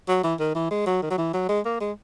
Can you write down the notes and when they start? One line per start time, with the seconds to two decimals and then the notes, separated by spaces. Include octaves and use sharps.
0.08 F#3
0.24 E3
0.40 D#3
0.55 E3
0.71 G#3
0.87 F#3
1.03 D#3
1.11 F#3
1.18 E3
1.34 F#3
1.49 G#3
1.66 A#3
1.81 G#3